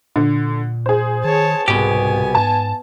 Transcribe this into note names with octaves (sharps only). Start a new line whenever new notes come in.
A#2 D3
G#4 C5
D#3 C#5 A5
C2 G#2 B2 B3 G4 G#5
G#2 A5